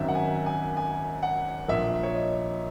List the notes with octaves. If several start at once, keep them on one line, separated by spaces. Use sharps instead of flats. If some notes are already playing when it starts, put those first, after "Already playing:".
Already playing: G#1 F#2 D#3 E5
F#5
G#5
G#5
G#5
F#5
A#1 A#2 E5
C#5
D#5